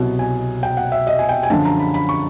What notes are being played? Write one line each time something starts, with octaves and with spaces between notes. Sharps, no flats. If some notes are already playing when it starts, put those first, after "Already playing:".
Already playing: C2 B2 F#3
G#5
G5
F#5
E5
D#5
G#5
G5
G#5
F#2 D3 F3 A5
A#5
B5
B5
C#6